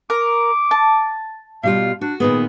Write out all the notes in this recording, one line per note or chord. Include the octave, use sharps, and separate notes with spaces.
A#4 D6
A5
B2 G3 F4 F5
D4 F#4
A#2 D#3 B3 G#4